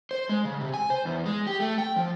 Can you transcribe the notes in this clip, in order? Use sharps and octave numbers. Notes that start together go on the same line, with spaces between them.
C5
G#3
C#3
C3
G#5
C5
E2
G#3
G4
A3
G5
F3